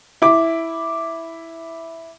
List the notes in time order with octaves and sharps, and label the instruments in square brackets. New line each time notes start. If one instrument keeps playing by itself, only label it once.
[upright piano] E4 D6